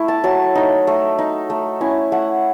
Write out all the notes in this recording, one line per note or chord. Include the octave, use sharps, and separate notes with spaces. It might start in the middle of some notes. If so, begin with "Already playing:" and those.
Already playing: A3 E4
A5
F#3 A5
A3 D#4
A3
D#4
A3
C#4 E4
A3 F#5